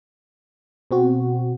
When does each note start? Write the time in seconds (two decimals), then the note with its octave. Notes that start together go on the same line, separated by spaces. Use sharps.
0.91 B2 C4 F#4